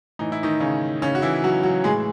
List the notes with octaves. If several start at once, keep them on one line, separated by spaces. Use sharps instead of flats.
A2 E3 D#4
E4
D#3 D#4
C#3 C#4
C#3 C#4
F#4
E3 E4
F#3 F#4
F#3 F#4
A2 E3 G#3 G#4